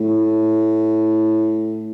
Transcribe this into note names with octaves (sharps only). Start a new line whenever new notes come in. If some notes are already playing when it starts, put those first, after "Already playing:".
Already playing: A2